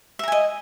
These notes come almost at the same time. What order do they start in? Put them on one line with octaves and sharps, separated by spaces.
E5 A#5 G#5 D#5